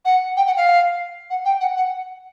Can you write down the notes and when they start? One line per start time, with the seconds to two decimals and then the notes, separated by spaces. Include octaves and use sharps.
0.04 F#5
0.36 G5
0.46 F#5
0.56 F5
1.30 F#5
1.45 G5
1.60 F#5
1.76 F#5